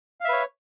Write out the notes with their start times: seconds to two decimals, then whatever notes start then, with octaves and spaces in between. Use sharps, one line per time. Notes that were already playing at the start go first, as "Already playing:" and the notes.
0.21 F5
0.25 E5
0.29 B4
0.33 C#5